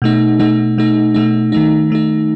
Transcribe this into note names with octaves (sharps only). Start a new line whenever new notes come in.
B2 A3 D#4
B2 A3 D#4
B2 A3 D#4
B2 A3 D#4
D#3 A3 D#4
D#3 A3 D#4